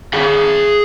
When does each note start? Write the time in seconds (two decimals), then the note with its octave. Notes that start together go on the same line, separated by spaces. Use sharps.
0.14 G#4 B5